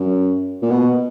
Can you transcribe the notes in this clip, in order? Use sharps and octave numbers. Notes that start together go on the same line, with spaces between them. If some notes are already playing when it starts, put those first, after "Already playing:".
Already playing: F#2
A#2
B2